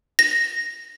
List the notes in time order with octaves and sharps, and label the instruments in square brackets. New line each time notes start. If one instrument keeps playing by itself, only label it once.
[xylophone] A#6